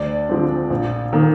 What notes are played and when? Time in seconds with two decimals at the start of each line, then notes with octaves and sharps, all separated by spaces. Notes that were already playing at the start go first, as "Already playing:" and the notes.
Already playing: D2 D5
0.29 D3 F3 G#3 C4
0.70 A#1
1.13 D#3 A#3